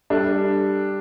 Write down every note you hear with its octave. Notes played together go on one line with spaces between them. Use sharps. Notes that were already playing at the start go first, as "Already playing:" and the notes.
G3 D4 A4